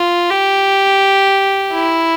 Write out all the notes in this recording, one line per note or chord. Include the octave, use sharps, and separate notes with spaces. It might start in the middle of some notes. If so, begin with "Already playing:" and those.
Already playing: F4
G4
E4